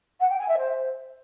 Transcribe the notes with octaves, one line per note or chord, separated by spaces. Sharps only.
F#5
G5
G#5
E5
C5